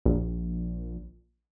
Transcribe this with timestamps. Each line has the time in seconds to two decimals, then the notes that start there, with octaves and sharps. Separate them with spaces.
0.06 A#1